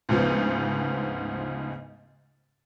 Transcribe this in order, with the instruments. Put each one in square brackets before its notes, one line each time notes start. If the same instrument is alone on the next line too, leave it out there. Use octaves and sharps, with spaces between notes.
[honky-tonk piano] D2 G#2 C#3 F3 B3